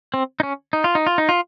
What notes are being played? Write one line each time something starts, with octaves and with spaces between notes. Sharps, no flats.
C4
D#4
C#4
D#4
F4
D#4
F4
D#4
F4